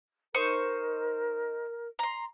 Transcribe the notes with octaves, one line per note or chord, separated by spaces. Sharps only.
D#4 A#4 C5 C#6
A#5 C6